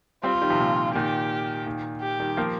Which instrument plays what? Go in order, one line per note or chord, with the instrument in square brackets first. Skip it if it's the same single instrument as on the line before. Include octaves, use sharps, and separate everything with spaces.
[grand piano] G3 C4 [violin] F4
[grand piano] D#3 G3
C3 F3
A#2 D#3
[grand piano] A#2 D#3 [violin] G4
[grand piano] A#2 D#3
[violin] G4
[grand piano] D#3 G3
F3 A#3